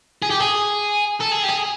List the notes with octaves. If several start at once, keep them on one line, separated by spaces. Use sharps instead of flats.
G#4
G4
G#4
A4
G#4
G4
G#4